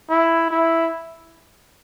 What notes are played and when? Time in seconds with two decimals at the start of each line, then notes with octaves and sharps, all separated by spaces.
0.10 E4
0.51 E4